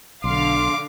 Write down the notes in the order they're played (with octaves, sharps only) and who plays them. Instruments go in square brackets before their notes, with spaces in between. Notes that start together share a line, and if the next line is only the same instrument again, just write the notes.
[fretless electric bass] B1 [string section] D3 F5 [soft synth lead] C6 [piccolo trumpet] D6